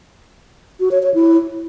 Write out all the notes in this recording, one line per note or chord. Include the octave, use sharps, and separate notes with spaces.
F#4
C#5
C#5
E4